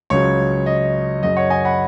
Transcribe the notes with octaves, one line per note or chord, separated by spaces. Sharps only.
C#2 C#3 F#3 C#5
D#5
F#2 C#3 F#3 D#5
C#5 F#5
D#5 G#5
F#5 B5